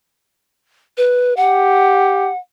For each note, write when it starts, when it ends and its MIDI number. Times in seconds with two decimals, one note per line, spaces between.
0.97 1.34 71
1.37 2.31 67
1.37 2.37 78